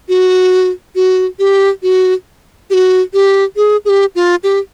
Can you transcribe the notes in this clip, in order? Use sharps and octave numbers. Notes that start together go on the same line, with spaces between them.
F#4
F#4
G4
F#4
G4
F#4
G4
G#4
G#4
G4
F4
G4